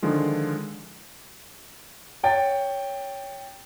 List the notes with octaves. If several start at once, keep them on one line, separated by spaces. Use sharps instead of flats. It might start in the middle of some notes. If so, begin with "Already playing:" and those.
D3 D#3 F3 G#3 F4
C#5 G5 A6